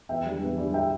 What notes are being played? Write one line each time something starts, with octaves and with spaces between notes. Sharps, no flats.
E2 E5 G5
D3 G3
E2
D3 G3
E5 G5